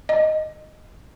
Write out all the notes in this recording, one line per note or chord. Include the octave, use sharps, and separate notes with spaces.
D#5